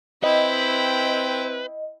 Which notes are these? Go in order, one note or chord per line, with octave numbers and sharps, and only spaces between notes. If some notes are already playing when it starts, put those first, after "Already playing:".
C4 E4 B4 D#5 G5